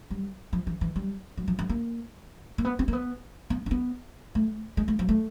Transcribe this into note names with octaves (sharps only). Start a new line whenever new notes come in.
G3
F3
E3
E3
G3
F#3
F3
F3
A#3
A#3
B3
C4
A#3
B3
B3
C4
B3
A3
G#3
A3
F#3
A3